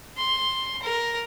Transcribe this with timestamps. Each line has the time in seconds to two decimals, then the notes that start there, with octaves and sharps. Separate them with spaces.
0.17 C6
0.82 A#4